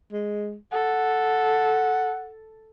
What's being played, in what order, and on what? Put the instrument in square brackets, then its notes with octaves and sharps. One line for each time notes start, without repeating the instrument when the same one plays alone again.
[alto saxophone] G#3
[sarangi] A4 [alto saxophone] F#5